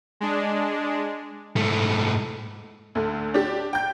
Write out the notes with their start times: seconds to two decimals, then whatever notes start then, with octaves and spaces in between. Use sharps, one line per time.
0.20 G#3 D4
1.56 G#2 A3
2.95 D2 D3
3.34 D4 G4
3.73 G5 G6